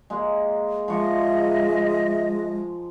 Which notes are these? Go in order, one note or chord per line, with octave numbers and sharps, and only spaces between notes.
G#3 A#3
F3 G#3 D#5 E5 C#6